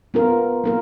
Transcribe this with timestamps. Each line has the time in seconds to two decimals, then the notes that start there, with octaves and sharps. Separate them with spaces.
0.14 B3 F4 A#4
0.64 A#3 F4 A#4